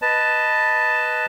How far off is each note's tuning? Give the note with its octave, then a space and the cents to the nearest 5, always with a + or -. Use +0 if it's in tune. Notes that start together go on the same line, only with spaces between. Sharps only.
B4 +0 D#5 +0 A5 +0